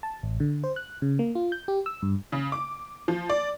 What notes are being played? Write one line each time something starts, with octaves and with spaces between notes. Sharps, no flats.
A5
A1
D3
C5
F#6
C#3
A#3
F4
G6
G4
E6
G2
C#3
D6
F3
D5